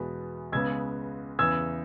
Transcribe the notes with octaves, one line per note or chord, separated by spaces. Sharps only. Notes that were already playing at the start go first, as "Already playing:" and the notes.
Already playing: E2 B2 G#3 B3
C#2 C#3 G#3 B3 E6 G#6
E2 C#3 E3 E6 G#6